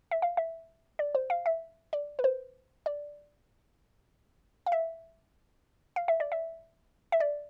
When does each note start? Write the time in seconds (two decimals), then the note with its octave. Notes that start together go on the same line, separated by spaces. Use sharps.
0.11 E5
0.22 F5
0.37 E5
0.99 D5
1.15 C5
1.30 F5
1.46 E5
1.93 D5
2.19 B4
2.24 C5
2.86 D5
4.66 F5
4.72 E5
5.96 F5
6.08 E5
6.20 D5
6.32 E5
7.12 E5
7.20 D5